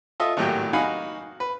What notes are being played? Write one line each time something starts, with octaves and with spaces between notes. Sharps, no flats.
F4 A4 D#5 E5
G#1 A2 F#3 A#3 G4 G5
D#4 F#4 F5 F#5 G#5 B5
B4